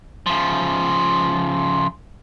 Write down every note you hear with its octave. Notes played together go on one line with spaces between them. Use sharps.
C#3 F3